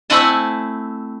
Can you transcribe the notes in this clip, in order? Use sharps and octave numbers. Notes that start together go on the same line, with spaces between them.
A3 C4 E4 F#5 G#5 A5